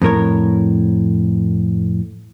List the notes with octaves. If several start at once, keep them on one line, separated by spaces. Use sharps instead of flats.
F2 A2 A#4 C#5